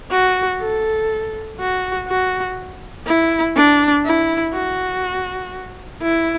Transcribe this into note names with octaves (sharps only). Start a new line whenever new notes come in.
F#4
A4
F#4
F#4
E4
D4
E4
F#4
E4